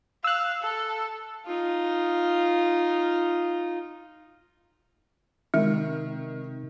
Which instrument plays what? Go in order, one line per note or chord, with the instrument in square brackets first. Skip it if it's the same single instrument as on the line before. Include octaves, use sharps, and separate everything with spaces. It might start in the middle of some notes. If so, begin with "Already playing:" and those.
[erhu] F5 [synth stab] E6 F#6
[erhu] A4
[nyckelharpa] D#4 F4
[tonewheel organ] C3 [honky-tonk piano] D#3 [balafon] G#3